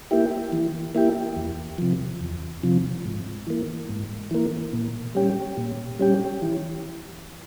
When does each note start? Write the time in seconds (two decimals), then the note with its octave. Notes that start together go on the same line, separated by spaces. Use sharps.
0.11 A#3 E4 G4
0.52 E3
0.95 A#3 E4 G4
1.36 E2
1.78 C3 F3
2.21 E2
2.63 C3 F3
3.05 G#2
3.47 E3 A#3
3.89 G#2
4.31 E3 A#3
4.73 A#2
5.15 G3 C#4 G4
5.57 A#2
5.99 G3 C#4 G4
6.42 E3